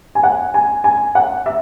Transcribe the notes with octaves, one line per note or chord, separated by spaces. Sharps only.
G#5
F#5
G#5
G#5
F#5
E5